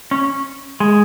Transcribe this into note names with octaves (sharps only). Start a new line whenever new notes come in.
C#4
G#3